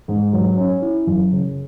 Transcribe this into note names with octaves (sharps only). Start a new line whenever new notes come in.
G#2
F#3
C#4
E4
F#2
C#3